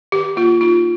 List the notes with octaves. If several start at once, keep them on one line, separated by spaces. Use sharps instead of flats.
D#3 G4
A#3 F4
D#4 F4